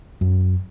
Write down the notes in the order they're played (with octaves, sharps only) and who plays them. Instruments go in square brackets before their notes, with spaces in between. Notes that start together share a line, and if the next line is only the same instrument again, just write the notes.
[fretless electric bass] F#2